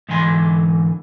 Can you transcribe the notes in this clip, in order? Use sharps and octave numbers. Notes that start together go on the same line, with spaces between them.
G#2 D3 E3 G#5 C6